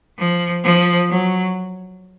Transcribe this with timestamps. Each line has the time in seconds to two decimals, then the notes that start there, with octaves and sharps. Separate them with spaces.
0.19 F3
0.64 F3
1.10 F#3